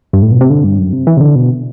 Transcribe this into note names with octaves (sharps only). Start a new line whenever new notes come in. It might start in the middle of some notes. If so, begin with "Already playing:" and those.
G2
A2
B2
C3
D3
G2
F#2
C3
E3
C3
D3
B2